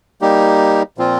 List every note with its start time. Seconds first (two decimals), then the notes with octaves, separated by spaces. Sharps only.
0.21 G3 A#3 D#4 G4
0.98 A#2 F3 C4 F4